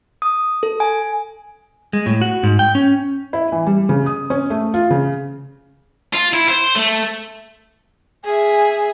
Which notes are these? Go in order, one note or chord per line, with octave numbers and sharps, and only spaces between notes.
D#6
A4
G#5
G#3
A2
F#4
G#2
G5
C#4
E4
E3
G3
C#3
D#6
C#4
A3
F4
C#3
F4
E4
C5
A3
G#4 E5 G#5